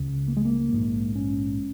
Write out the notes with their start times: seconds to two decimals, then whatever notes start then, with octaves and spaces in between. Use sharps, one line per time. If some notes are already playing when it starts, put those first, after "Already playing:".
Already playing: C#2 C#3
0.28 A#3
0.37 G#3
0.45 A#3
0.72 A#1 G#2
1.15 C#4